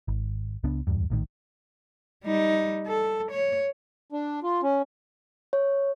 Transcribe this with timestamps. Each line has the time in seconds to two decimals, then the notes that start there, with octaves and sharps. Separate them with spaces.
0.08 G#1
0.64 C#2 C#3 B3 D4
0.87 D1 G#1 E2 G2
1.10 A#1 A2 D#3
2.24 G3 D#4
2.87 A4
3.31 C#5
4.12 D4
4.43 F4
4.63 C#4
5.53 C#5